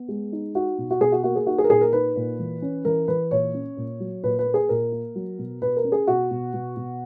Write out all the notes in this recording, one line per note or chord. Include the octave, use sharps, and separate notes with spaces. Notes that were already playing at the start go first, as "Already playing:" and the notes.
Already playing: B3
G#3
D#4
D#4 F#4
B2
F#4
B2 G#4
F#4
A#3 F#4
G#4
D#4 F#4
G#4
A#4
A#2 G#4
A#4
D#4 B4
A#2
E3
C#4
E3 A#4
E3 B4
A#2 C#5
C#4
A#2
F#3
A#2 B4
B4
A#3
G#4
A#2 A#4
A#3
F#3
B2
B2 B4
A#4
C#4
G#4
B2 F#4
B2
B2
B2